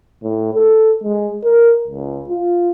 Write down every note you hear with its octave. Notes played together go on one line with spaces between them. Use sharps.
A2
A4
G#3
A#4
C#2
F4